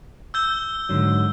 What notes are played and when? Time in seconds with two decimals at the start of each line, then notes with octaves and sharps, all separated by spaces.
0.34 E6 G6 G7
0.89 G#2 D3 F#3